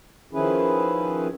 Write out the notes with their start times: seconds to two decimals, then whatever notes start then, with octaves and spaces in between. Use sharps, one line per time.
0.33 D#3 F3 C#4 E4 G#4 B4